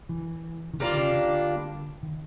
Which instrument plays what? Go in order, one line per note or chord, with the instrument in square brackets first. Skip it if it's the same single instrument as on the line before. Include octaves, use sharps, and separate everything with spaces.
[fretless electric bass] E3
D#3
[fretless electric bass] D3 [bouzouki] G3 A#3 D4 F4
[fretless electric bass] C#3
D3
D#3